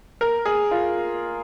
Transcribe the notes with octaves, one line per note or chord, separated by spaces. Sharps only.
A#4
G#4
F4